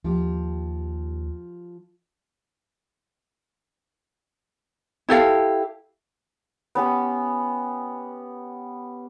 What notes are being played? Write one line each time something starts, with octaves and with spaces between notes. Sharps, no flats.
D#2 F3 G4
E4 G4 A4 F5
B3 C#4 G4